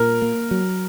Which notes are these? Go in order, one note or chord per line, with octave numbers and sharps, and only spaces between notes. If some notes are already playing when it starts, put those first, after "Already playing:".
Already playing: A#2 A#4
A#3
F#3